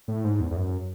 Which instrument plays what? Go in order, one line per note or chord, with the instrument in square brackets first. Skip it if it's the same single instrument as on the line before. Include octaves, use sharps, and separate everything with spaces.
[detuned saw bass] A2
G#2
E2
E2
F#2